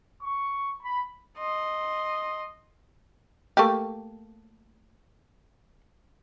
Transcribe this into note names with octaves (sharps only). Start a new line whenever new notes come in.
C#6
B5
D#5 C6
A3 A#3 G4